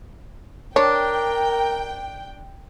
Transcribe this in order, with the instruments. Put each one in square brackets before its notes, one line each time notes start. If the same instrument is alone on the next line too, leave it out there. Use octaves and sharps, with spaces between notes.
[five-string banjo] D4 [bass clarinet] A#4 [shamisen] C#5 [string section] G5